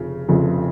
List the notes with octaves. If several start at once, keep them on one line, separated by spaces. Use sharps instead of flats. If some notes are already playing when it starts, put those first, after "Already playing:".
Already playing: F1 C#3 F3
F1 F2 C#3 F3